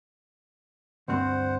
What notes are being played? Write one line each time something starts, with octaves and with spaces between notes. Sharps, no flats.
D2 G2 C4 C5 F#5